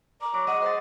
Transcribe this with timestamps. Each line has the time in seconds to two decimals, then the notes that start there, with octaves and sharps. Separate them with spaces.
0.22 D5 A#5
0.34 F#3 D6
0.47 G#3 D#5 F#5
0.62 C5 C6 A6